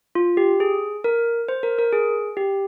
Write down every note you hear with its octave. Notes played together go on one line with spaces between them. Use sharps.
F4
G4
G#4
A#4
C5
A#4
A#4
G#4
G4